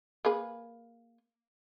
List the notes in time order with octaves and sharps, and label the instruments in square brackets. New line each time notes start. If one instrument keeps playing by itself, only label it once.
[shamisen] A#3 G#4 B4